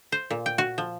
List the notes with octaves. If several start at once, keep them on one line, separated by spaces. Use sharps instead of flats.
C5
A#2
G5
F#4
F3